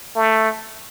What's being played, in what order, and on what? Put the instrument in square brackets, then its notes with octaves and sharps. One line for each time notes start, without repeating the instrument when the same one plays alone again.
[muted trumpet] A3